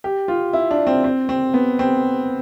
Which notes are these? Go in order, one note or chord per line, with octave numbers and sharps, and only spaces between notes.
G4
F4
E4
D4
C4
C4
C4
B3
C4